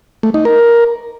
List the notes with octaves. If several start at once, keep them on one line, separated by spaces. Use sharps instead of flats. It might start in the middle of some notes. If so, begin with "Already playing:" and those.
A3
D#4
A#4